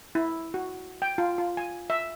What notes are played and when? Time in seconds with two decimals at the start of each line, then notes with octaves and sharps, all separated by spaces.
0.15 E4
0.54 F#4
1.02 G5
1.18 F4
1.38 F4
1.57 G#5
1.90 E5